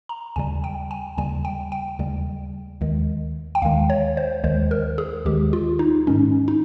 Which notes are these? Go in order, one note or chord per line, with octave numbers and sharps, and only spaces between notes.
A#5
D#2 C#3 G3 G#5
G5
G#5
D#2 C#3 G3 G#5
G5
G5
D#2 C#3 G3
D#2 D#3 G#3
G5
D#2 D#3 G#3 F5
C#5
C5
D#2 D#3 G#3 C5
A#4
G#4
D#2 D#3 G#3 G4
F4
D#4
G#2 D#3 G#3 C#4
D#4